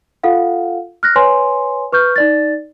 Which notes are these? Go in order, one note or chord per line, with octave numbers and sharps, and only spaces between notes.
F4 A4 F5 F#5
F6 F#6 A#6
B4 C#5 G#5 C6
B4 C#6 F6 G6
D#4 D5 A6